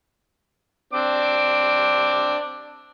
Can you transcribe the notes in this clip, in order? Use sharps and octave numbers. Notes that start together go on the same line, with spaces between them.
C4 D4 D6